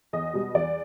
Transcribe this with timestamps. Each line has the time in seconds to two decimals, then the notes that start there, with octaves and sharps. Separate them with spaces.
0.13 E2 D#5
0.33 B2 G3
0.54 E2 D5